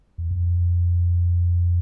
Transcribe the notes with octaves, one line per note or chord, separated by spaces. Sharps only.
E2
F2